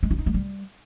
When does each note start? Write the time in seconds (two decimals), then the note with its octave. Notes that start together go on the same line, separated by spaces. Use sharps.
0.03 G#3
0.11 E4
0.18 D#4
0.26 G#3
0.34 G3